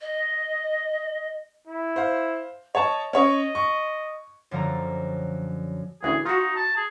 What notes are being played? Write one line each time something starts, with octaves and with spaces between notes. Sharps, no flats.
D#5
E4
C5 F5
C#5 D#5 A5
C#4 C#5 D#5
C#6
F#2 D3 F3 A3 A#5
A1 D2 E3 G#4
D#4 F4 F#4
A5
G#4